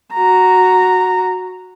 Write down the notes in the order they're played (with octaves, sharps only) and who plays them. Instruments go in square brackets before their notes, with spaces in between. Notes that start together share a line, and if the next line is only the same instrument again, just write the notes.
[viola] F#4 A#5